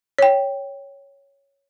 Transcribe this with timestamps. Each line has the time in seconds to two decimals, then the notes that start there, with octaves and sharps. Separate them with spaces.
0.18 C#5 G5